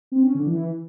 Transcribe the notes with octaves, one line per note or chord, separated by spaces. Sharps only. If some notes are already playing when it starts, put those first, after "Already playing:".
C4
C#4
D3
E3